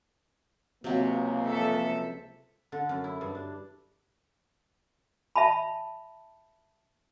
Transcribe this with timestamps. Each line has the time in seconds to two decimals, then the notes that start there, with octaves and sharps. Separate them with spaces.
0.84 C#2 C3 F#3 A#3
1.46 F3 A4 E5
2.72 D3
2.89 F#2
3.04 E4
3.21 G2
3.35 D4
5.36 E5 A5 B5